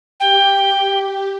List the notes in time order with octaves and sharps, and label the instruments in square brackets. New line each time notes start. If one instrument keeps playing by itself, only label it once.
[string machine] G4 [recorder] G5